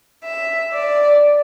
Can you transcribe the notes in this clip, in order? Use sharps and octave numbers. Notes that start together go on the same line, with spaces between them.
E5
D5